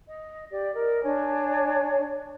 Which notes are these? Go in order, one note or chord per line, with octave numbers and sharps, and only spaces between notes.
D#5
G4 D5
A#4 D#5
D4 C#5 G#5